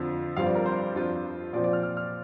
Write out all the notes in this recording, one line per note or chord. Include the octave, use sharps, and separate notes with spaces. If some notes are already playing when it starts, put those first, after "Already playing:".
Already playing: F2 D3 F3
G2 F3 C4 F5
D5
A#4
C5
F2 F3 D4 F4
A#2 F3 C4 D5
D5
F6
F6
F6